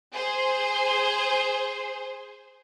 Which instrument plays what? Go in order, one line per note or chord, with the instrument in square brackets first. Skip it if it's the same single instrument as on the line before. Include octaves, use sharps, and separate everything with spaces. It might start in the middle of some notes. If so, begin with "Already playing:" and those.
[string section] G#4 C5